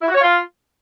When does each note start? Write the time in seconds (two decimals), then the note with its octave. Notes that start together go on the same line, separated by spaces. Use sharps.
0.02 E4
0.08 F#4
0.15 C#5
0.21 F4